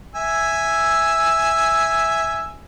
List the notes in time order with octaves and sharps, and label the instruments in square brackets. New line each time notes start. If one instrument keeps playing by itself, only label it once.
[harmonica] E5 G#5 E6